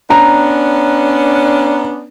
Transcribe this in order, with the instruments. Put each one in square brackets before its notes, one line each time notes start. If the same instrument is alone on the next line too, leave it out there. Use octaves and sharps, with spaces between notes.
[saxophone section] B3 C#4 D4 [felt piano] A#5